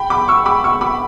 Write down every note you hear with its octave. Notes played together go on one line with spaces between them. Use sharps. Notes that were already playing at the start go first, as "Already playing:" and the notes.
Already playing: G5 B5
B5 D6
C#6 E6
B5 D6
C#6 E6
B5 D6